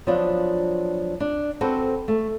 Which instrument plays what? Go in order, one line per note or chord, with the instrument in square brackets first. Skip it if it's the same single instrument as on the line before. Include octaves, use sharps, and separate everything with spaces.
[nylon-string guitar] F3 F#3 B3 D4 F4
D4
C4 F#4 A4 B4 C5
A3